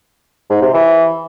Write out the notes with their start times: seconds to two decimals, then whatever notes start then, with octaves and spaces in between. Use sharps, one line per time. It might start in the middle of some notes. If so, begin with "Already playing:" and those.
0.50 G#2
0.62 C3
0.74 E3